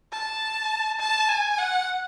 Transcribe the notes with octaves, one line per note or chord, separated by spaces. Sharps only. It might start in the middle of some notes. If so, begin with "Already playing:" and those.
A5
A5
G#5
F#5